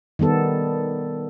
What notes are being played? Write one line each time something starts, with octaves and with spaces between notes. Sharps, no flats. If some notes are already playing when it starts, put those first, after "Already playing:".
D#3 G3 B3 A4